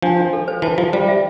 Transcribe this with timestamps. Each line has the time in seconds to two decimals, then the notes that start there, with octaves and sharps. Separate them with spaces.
0.02 F3 D4
0.18 D4
0.33 A4
0.48 C5
0.62 E3 A5
0.77 F3 F4
0.93 G3 C5
1.08 E5